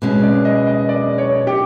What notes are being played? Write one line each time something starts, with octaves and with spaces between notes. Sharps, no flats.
B2 G#3 C#4
D5
D#5
D#5
D5
C#5
G4